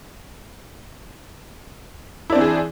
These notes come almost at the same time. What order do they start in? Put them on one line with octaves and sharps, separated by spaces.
E4 D4 C4 E3 G#4